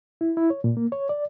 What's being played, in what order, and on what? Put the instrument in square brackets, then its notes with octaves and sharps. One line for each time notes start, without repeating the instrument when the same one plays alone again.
[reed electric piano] E4
E4
C#5
A#2
A#3
C#5
D5